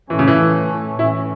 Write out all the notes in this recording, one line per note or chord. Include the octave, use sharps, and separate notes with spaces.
A2 E3 A3 C#4
C#3
E3
A2 E3 C#4 E4